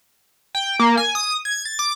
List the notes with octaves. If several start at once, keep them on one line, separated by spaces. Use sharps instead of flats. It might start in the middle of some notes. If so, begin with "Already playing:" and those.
G5
A#3
G#5
D#6
G#6
A6
D6